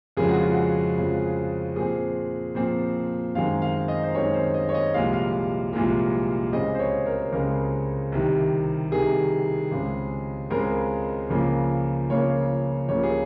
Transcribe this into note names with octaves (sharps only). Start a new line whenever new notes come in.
F2 C#3 F3 G#3 G#4
F#4
F4
F#4
F2 C#3 F3 G#3
A#2 F3 C4 G#4
A#2 F3 C4
F#2 D#3 G#3 C4 F5
F5
D#5
C5
F#2 D#3 G#3 C4 C#5
C5
D#5
C#5
D#5
C2 A#2 F3 G#3 F5
F5
C2 A#2 F3 G#3
C#2 C#3 G#3 C4 D#5
C5
C#5
A#4
C#2 C#3 G#3 C4 A#4
C2 C3 D#3
C2 C3 D#3 G#4
C#2 C#3 G#3 C4
C#2 C#3 G#3 C4 A#4
C#2 C#3 F3 A#3
C#2 C#3 F3 A#3 C#5
C#2 C#3 F3 A#3 C#5
G#4